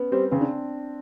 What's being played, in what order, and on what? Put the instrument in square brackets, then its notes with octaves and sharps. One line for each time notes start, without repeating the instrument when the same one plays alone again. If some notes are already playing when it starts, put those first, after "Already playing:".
Already playing: [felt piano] B3 C#4
[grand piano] G3 C4
[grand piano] C#3 [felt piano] C4
[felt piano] D4